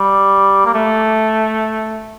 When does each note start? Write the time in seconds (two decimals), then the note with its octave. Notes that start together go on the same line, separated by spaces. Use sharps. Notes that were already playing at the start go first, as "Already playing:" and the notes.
Already playing: G3
0.65 A#3
0.74 A3